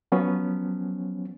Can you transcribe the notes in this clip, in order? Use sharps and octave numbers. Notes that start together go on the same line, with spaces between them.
F3 F#3 B3 C#4